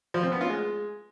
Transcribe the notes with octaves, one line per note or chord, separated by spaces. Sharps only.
F3
C4
B3
F4
G#3